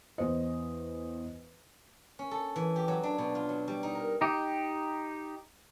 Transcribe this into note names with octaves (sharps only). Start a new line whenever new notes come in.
E2 C5 D#5
C#4
A4
E3
G4
F#3
D4
B2
F4
F#3
G3
D#4
A#4
D#4 G4